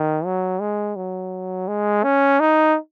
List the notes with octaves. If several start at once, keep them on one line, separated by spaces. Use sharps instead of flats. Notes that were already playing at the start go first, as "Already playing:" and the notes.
Already playing: D#3
F#3
G#3
F#3
G#3
C#4
D#4